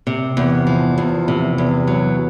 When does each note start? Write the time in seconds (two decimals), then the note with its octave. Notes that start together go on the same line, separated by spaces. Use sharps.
0.07 C3
0.37 E2
0.67 F3
0.98 E2
1.28 C3
1.58 E2
1.88 F#3